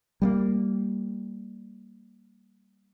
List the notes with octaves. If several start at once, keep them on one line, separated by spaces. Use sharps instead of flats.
G3 A3 A#3